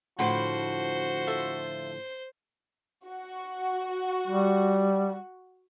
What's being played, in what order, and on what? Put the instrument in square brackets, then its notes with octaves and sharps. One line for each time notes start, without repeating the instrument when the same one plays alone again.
[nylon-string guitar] A2 D3 F3 [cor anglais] F#4 [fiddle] C5 [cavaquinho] F#5 B5 C6
[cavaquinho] F4 A4 E5
[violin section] F#4
[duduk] G3